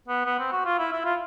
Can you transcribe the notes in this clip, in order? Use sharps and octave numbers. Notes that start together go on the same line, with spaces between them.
B3
B3
C4
F#4
F4
E4
E4
F4